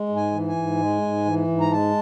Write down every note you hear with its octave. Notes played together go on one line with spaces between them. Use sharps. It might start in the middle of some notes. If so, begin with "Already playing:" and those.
Already playing: G#3
G#2
G#5
E3
G#5
G#2
G#3
G#2
E3
G#2
A#5
G#3 A5